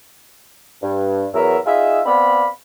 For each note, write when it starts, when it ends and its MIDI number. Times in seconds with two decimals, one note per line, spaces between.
0.83 1.27 43
1.34 1.58 40
1.34 1.58 54
1.34 1.58 59
1.34 1.58 70
1.34 1.58 76
1.66 2.01 63
1.66 2.01 65
1.66 2.01 68
1.66 2.01 76
2.06 2.46 59
2.06 2.46 60
2.06 2.46 74
2.06 2.46 77
2.06 2.46 83